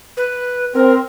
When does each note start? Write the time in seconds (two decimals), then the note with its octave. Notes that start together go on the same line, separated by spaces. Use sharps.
0.17 B4
0.74 C4 A#4